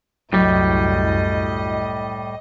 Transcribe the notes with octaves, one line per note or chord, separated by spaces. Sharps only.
C2 F#2 A2 F#3 G3 D#5